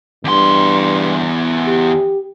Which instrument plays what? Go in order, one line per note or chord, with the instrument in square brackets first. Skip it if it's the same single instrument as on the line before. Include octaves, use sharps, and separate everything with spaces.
[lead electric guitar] E2 C6 [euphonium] G2
[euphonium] G4